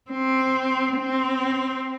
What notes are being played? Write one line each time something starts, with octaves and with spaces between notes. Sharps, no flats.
C4
C4